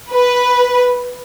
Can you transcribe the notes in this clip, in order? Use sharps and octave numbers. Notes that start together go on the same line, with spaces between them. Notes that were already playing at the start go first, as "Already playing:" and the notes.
B4